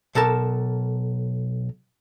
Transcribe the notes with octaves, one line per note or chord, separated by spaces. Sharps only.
B1 A4 A#4 A5